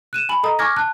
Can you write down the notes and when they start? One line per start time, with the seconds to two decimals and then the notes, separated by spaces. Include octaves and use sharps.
0.13 F#6 D#7 E7
0.29 G#5 B5 F#7
0.43 A4 D#5 A#5 D#6
0.59 G#5 C#6 D6 F6 G#6 A#6
0.76 A5 F#6